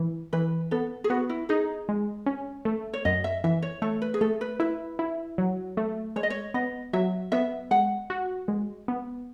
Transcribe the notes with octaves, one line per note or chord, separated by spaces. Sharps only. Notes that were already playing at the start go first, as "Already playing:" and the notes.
Already playing: E3
E3 B4
B3 A4
G#4
B3 F#4
E4
D#4 G#4
G#3
C#4
A3
C#5
F#2 D#5
E5
E3 E5
C#5
A3 C#5
B4
G#4
A3 A4
B4
E4 B4
E4
F#3
A3
G#3 C#5
D#5
C#5
B3 D#5
F#3 E5
B3 E5
G#3 F#5
F#4
G#3
B3